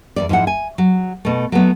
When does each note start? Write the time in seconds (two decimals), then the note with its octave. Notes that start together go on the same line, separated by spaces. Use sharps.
0.16 E2 G#2 D5
0.29 G#2 F3 E4 F#5
0.47 G#5
0.78 F#3
1.25 B2 A3
1.52 F#3 A3 B3